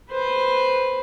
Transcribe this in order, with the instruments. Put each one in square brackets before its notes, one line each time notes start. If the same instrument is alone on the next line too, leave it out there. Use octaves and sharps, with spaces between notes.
[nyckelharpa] B4 C5